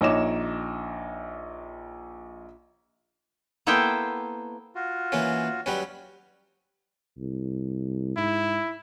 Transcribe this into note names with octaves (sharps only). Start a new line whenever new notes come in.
A#1 D#4 C#5 D6 E7
A#3 B3 E4 A4 C5 G5
F4 F#4
E3 A#3 C#4
F#3 G3 C#4 B4
C2
G#2 E4